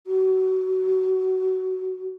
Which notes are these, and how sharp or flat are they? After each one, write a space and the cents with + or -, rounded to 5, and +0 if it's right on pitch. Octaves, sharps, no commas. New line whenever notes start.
F#4 +20